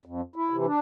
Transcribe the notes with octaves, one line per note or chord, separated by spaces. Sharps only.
F2
E4
C3 E3
D4